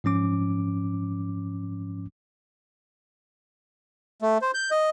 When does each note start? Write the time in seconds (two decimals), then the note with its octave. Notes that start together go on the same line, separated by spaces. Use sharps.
0.04 G#2 F3 C#4 D6
4.22 A3
4.42 C5
4.54 G6
4.71 D#5